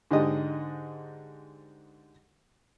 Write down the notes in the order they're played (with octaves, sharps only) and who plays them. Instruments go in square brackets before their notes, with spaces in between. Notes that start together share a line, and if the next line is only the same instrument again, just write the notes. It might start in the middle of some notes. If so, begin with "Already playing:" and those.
[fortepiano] G#2 D3 G4 D#5